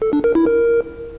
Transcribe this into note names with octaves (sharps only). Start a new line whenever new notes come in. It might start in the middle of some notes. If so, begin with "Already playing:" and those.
A4
D4
A#4
E4
A#4